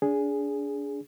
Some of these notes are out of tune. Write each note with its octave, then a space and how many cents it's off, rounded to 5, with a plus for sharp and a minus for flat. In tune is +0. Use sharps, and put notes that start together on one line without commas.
D4 -30 G#4 +0